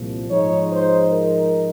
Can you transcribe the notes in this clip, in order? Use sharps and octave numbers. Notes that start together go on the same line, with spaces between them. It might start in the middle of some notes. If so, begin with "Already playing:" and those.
Already playing: C2 A#2 F3
G#2 F3 G#3 D#4 C#5
C5
A#4